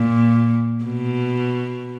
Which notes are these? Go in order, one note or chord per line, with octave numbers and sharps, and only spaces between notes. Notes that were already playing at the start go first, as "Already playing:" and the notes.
Already playing: A#2
B2